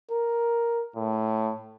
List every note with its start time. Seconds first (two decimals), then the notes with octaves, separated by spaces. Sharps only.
0.11 A#4
0.95 A2